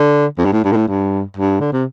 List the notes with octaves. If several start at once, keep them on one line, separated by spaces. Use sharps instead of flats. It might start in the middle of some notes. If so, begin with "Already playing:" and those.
Already playing: D3
F2
G2
A2
G2
A#2
A2
G2
G2
D3
C3